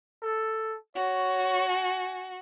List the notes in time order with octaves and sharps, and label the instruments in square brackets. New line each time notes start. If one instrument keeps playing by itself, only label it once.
[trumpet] A4
[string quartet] F#4 [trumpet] C#5
[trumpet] G#5